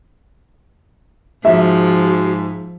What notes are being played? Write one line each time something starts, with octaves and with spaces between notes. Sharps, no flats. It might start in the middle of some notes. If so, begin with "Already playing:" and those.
G#2 F3 F#4 E5